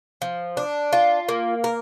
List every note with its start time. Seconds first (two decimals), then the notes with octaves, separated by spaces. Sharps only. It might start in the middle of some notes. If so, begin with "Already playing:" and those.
0.22 F3
0.57 D4
0.93 F4
1.29 A#3
1.64 A#4